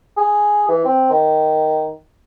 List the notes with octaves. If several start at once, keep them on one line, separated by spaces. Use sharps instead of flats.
G#4
E3
C4
D#3